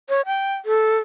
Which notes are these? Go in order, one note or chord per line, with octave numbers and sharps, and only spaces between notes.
C#5
G5
A4